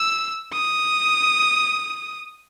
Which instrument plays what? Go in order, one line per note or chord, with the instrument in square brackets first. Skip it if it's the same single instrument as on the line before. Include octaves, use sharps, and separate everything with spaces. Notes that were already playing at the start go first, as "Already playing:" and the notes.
Already playing: [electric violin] E6
D#6